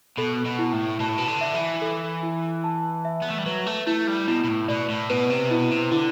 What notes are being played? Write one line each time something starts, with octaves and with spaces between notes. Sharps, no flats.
B2 A4
B2
E4
A2
B2 A5
A2
B2
D3
E5
E3
A4
E4
A5
E5
B3
A3
G3
F#3 B4
A3
A3 E4
G3
B2 E4
B2
A2
B2 D5
A2
B2 B4
C3
B2 E4
C3
D3 E4